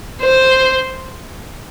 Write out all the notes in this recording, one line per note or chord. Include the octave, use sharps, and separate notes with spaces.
C5